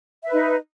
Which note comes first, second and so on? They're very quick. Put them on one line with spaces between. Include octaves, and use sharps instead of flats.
E5 B4 D#4